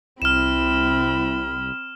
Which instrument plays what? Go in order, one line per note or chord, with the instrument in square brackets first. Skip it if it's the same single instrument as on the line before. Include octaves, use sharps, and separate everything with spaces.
[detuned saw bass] C2 [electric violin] C4 B5 [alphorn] E4 [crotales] F6 E7